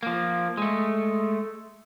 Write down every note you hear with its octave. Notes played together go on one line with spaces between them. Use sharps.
F3 A#3
G#3 A3